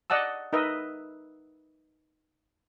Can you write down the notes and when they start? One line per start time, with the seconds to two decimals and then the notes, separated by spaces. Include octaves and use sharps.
0.10 D5 D#5 F#5 A5 E6
0.53 D#4 A#4 B4 D#5 E5